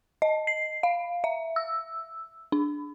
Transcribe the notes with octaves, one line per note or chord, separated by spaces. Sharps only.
D#5
C7
F5
E5
E6
D4